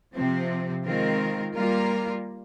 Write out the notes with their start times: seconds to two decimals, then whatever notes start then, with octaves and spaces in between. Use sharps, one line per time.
0.15 C3 F3 C4
0.85 D#3 G#3 C4 F4 A#4
1.55 G3 A#3 F4 A#4